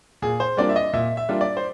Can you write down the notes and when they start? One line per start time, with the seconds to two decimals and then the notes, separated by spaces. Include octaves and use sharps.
0.22 A#2 G#4
0.40 C5
0.57 G3 A#3 D4 F4 D5
0.69 E5
0.76 D#5
0.93 A#2 E5
1.17 E5
1.29 G3 A#3 D4 F4
1.41 D5
1.57 C5